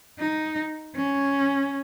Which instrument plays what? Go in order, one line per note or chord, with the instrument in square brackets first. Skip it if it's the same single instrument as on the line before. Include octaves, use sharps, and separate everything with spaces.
[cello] D#4
C#4